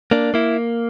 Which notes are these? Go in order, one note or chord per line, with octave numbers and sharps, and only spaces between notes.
A#3 D4
A#3 E4